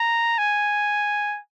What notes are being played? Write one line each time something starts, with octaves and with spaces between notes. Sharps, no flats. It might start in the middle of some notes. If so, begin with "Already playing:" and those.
Already playing: A#5
G#5